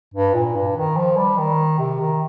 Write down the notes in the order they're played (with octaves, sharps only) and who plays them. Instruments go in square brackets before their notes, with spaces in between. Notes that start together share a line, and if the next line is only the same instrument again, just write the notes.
[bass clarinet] G2
A#2
G2
D#3
F3
G3
D#3
C3
D#3